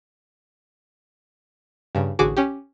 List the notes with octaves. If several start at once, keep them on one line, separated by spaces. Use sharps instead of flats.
G2 C#3
A1 D3 F#4 G#4 D6
C#4 G4